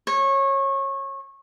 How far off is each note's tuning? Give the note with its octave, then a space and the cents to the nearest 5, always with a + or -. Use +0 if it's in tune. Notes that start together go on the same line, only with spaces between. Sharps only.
C#5 -25